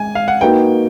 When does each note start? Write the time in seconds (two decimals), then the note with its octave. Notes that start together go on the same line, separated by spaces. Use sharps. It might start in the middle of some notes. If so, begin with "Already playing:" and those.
Already playing: G#3 G#5
0.15 F5
0.28 F#5
0.41 A#3 D#4 F#4 B4 G5